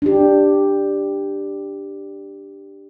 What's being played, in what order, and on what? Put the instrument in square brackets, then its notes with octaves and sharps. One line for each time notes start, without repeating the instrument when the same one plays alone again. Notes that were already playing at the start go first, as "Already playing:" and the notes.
[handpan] D4 G4